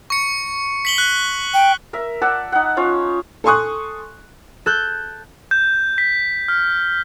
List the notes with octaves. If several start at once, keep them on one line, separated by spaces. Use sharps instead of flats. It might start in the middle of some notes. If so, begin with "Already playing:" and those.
C#6 C#7
B6 F#7 G7
F#6
G5
A#4 E5
D5 F#5 A5 E6
D#4 F#5
C#4 F4
A4 G#5 C6 C#6 D#6 F#6
A4 F#6 G6
G6
B6
F6